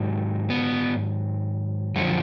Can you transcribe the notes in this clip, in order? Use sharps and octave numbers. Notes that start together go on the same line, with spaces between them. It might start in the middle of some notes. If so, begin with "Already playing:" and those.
Already playing: G#2 D#3 F#3
B3
F#2 D3 F3 A3